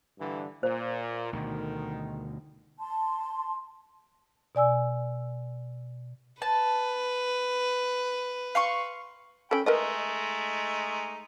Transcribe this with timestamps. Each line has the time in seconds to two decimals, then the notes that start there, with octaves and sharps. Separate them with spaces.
0.19 G2 D3 E3
0.63 A#2 C5
1.33 D2 B2 D3 D#3
2.79 A5 C6
4.55 B2 D5 G#5 E6
6.42 B4 A5
8.55 F5 C6 C#6
9.51 C#4 A4 G5 B5
9.66 G#3 A3 D#4 A#4 B4 D#5